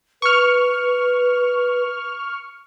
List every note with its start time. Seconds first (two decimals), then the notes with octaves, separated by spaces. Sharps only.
0.22 B4 C#6 F6